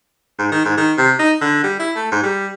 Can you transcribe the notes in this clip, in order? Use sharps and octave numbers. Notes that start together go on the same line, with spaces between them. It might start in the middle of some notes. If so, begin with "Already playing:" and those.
G#2
D#3
G#2
D#3
C3
D#4
D3
G3
E4
A3
G#2
G3